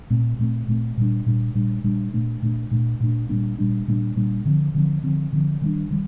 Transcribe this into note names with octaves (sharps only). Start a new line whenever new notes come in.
A#2 A3 C4
A#2 A3 C4
A#2 A3 C4
A#2 G3 D4
A#2 G3 D4
A#2 G3 D4
A#2 G3 D4
A#2 A3 D4
A#2 A3 D4
A#2 A3 D4
A#2 A3 D4
A#2 G3 A#3 D4
A#2 G3 A#3 D4
A#2 G3 A#3 D4
A#2 G3 A#3 D4
D3 F3 C4
D3 F3 C4
D3 F3 C4
D3 F3 C4
D#3 G3 D4
D#3 G3